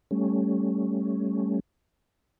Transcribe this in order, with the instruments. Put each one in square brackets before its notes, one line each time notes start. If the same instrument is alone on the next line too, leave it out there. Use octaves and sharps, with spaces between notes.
[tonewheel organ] G3 A3 C#4